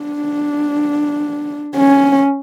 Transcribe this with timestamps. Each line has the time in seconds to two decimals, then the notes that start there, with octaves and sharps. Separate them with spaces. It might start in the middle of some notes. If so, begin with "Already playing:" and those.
Already playing: D4
1.76 C#4